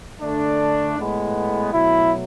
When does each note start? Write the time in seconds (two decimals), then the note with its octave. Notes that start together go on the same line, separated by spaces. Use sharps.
0.21 D3 A3 D4
0.97 A2 G#3 B3
1.73 B2 F#3 A3 E4